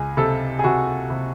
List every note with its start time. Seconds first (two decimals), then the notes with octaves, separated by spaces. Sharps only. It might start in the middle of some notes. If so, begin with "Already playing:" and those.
Already playing: C#2 G#4
0.17 C3 A4
0.59 G#4
0.64 C3 F#4
1.10 C3